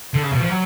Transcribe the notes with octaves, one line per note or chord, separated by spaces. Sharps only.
D3
C#3
B2
F3
F#3